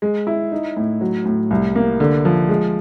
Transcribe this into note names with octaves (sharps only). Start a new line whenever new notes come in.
G#3
E4
D#4
A2
F#3
A2
C2
A#3
D3
F3
G#3